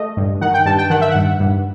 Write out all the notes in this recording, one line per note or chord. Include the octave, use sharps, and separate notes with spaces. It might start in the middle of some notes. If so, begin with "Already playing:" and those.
Already playing: A3 D#5
G2
D#3 F#5
G5
G2 A5
G5
D#3 F#5
E5
G2 F#5
G2